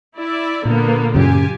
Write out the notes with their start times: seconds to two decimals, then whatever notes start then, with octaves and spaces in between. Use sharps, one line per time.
0.17 E4 D5 E5
0.65 A#2 D3 A#3 B3
1.15 F#2 C#3 F4 G4 G#5